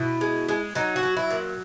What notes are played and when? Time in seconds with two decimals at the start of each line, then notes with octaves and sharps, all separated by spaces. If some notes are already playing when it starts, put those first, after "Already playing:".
Already playing: B2 E4
0.21 G#3
0.49 G#3
0.75 F#3 D#4
0.96 F#4
1.03 F#3
1.17 E4
1.31 A#2